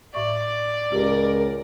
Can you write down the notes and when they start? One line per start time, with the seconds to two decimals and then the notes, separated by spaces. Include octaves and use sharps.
0.15 A2 D5 E5 C#6
0.92 C#2 G4 A#4